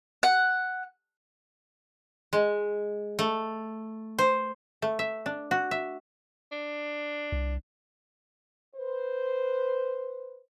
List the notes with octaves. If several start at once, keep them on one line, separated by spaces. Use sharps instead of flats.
F#5
G#3
A3
C5
A3
E5
D4
F#4
E5
D4
C2
B4 C5